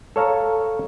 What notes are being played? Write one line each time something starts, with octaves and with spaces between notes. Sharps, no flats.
A4 C#5 F5 A#5